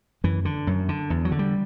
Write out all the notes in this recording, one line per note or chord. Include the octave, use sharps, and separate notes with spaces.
F#2 E3
D3
F#2
D3
E2
F#3
D3
G3